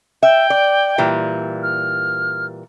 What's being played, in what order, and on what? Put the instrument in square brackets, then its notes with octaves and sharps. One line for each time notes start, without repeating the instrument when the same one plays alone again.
[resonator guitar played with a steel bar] E5 [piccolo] G5
[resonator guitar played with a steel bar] D5
A#2 E3 G3
[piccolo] F6